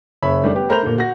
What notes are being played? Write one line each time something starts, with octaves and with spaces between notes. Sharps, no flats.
F#1 C#5 E5 B5
D#3 G3 A3 D4
B3 G4
A3 A#4 C5 B5 G6 F7
A#2 D3
F#4 A#6